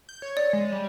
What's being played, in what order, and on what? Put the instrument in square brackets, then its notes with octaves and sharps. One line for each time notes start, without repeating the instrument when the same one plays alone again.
[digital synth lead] G6
C#5
[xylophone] D5
[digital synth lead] G#3
G3